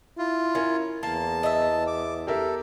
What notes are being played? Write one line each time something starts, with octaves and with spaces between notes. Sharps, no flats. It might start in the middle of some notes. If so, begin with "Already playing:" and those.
E4 F4
C#4 A#4
E2 A#3 A5
D#5 E5
D6
G4 A4 A#4 E5